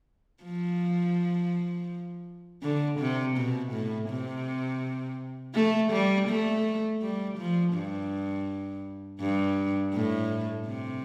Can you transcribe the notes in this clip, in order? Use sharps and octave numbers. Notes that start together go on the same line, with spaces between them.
F3
D3
C3
B2
A2
C3
A3
G3
A3
G3
F3
G2
G2
A2
C3